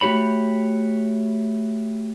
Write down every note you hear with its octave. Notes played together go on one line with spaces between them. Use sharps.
A3 F#4 G4 C#5 B5